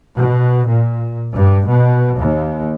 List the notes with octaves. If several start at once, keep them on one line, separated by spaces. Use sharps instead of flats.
B2
A#2
G2
B2
D#2